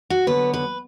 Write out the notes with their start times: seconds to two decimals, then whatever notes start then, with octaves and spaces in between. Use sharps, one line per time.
0.10 F#4
0.27 D3 F#3 B3 B4
0.54 B4